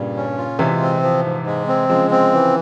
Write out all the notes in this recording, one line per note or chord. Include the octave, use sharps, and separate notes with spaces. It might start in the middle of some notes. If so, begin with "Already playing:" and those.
Already playing: G2 A#2 C#3 G3
C#4
F4
C3 E3 G#3
C4
F3
G#2
G#3
C4
C#3 F3 G#3
C4
E3